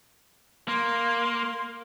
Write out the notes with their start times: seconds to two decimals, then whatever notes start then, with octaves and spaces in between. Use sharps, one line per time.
0.68 A#3 C6